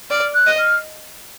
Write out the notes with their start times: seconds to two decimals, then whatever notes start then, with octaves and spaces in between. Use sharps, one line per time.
0.11 D5 F6
0.34 F#6
0.46 D#5
0.58 F6